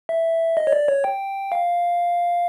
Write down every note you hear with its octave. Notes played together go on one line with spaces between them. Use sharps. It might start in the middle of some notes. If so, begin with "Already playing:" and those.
E5
D#5
C#5
D5
C#5
G5
F5